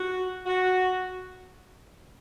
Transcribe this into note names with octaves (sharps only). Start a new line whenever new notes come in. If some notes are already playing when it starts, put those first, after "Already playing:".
Already playing: F#4
F#4